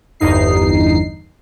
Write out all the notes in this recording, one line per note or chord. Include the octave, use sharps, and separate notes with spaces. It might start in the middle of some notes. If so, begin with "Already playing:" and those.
G1 E2 G2 D#4 C7